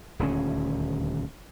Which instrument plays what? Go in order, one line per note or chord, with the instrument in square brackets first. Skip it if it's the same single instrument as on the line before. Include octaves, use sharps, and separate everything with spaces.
[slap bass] D#1 D2 C#4